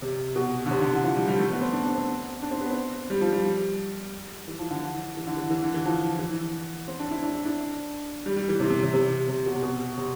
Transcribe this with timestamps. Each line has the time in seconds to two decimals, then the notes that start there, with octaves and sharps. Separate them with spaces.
0.02 C3
0.36 B2
0.66 D3
0.71 C3
0.81 D3
0.93 E3
1.04 F3
1.16 G3
1.28 G3
1.39 A3
1.50 B3
1.61 C4
1.73 D4
1.85 D4
1.96 C4
2.42 D4
2.51 C4
2.61 B3
2.70 C4
3.10 G3
3.21 F3
3.33 G3
4.48 E3
4.59 F3
4.71 D3
4.82 E3
5.17 E3
5.27 D3
5.37 E3
5.51 E3
5.62 D3
5.74 E3
5.86 F3
6.19 E3
6.88 C4
6.99 D4
7.11 E4
7.22 D4
7.34 E4
7.45 D4
8.26 G3
8.36 G3
8.49 E3
8.60 C3
8.70 C3
8.83 C3
8.94 C3
9.29 C3
9.46 B2
9.55 C3
9.63 B2
9.98 C3